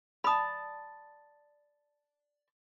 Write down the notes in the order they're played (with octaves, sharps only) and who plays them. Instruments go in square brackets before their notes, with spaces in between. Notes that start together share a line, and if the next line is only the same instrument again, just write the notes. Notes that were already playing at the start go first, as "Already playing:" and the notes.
[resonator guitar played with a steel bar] D5 A5 [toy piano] B5 D#6